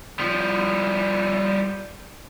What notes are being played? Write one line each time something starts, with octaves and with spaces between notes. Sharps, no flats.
F3 G3